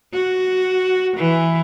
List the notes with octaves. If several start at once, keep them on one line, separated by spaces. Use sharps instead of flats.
F#4
E3